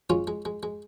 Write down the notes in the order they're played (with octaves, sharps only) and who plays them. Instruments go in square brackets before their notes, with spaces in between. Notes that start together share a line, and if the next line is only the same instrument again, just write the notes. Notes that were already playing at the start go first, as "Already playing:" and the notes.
[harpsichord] G#3 C#4 F4
G#3
G#3
G#3